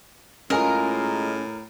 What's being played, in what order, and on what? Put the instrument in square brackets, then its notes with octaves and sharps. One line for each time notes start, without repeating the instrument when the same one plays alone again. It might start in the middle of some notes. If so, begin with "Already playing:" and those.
[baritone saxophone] A2 [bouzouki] G#3 F4 [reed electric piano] C#4 G#5 [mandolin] A#4